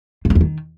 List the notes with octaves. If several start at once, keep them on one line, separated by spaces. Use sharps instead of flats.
F#2
F2
E2
D#3